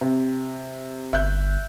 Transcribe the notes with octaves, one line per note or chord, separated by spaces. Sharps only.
C3
G1 E5 F#6 G6